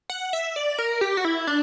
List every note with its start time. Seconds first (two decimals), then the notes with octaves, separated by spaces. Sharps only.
0.10 F#5
0.33 E5
0.56 D5
0.79 A#4
1.01 G4
1.17 F#4
1.25 E4
1.47 D4